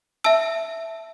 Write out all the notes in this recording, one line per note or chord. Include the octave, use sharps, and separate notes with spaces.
E5 A5 E6